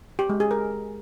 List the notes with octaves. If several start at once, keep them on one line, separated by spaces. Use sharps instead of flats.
G4
G#3
G#4
A#4